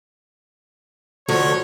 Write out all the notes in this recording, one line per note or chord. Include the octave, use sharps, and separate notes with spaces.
D2 F3 A3 C#5